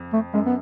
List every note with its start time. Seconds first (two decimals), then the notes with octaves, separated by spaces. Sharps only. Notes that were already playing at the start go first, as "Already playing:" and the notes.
Already playing: F2
0.13 A3
0.34 F#2 G#3
0.46 B3